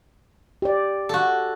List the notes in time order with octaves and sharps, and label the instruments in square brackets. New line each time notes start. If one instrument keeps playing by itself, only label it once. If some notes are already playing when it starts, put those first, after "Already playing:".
[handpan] G4 D5
[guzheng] F#4 A4